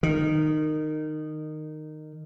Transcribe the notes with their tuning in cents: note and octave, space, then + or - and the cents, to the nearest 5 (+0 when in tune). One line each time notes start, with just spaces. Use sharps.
D#3 -15